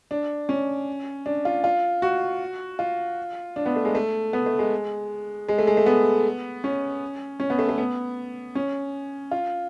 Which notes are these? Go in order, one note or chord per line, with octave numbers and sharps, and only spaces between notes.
D4
C#4
D4
F4
F4
F#4
F4
D4
B3
A3
G#3
A3
B3
A3
G#3
G#3
A3
G#3
A3
B3
C#4
C#4
B3
A3
A3
B3
C#4
F4